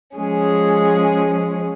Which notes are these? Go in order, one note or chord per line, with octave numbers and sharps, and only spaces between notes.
F3 G#3 C#4 G#4